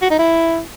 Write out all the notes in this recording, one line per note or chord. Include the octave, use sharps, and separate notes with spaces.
F#4
D#4
E4